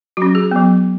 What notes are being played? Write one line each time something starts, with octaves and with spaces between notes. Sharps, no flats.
F#3 C#4 F#4
G#4
F#3 B3